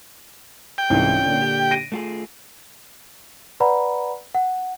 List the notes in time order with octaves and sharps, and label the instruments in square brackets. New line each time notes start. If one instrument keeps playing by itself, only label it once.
[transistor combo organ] G5
[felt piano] C2 G#2 E3 [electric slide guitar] C4 C#4 F4
[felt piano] A#2 D3
[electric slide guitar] G4
[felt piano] A#6 D7 D#7
[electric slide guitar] A3 F4 G#4
[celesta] B4 D5 F#5 A#5 B5
F#5